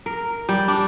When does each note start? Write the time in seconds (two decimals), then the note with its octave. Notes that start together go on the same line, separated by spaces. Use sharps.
0.06 A#4
0.49 G3
0.68 D4